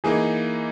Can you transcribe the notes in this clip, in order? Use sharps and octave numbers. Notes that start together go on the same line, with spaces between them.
E3 A#3 D#4 G#4